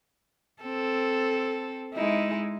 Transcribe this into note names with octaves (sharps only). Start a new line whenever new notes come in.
C4 A4
G#3 D#4 E4